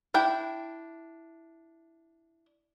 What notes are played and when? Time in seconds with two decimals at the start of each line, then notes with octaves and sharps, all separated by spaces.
0.14 D4 E4 G5